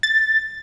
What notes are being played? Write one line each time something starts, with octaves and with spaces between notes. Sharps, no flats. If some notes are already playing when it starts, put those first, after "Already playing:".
A6